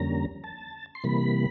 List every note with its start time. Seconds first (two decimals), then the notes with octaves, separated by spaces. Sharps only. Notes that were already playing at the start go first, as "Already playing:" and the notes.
Already playing: F2 D3 G3 A#3 C#4 A#5
0.44 A5
0.95 C6
1.04 C3 E3 G3 A#3 B5